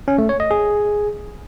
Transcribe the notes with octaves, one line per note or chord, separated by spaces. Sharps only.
C#4
A3
C#5
D#5
G#4